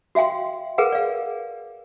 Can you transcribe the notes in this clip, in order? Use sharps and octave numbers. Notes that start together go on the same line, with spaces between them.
F#4 E5 F5 G5 C6
G#4 A#4 B4 F5 F#5
D5 F5